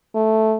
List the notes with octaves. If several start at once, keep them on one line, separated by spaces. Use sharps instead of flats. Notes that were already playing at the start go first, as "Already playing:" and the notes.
A3